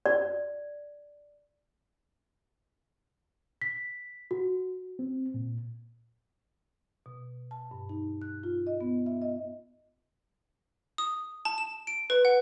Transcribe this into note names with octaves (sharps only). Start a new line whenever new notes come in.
D5
B6
F#4
C4
A#2
B2
A5
G2
D#4
F#6
F4
D#5
B3
E5
D#5
D#6
A5
E7
D7
B4
F#5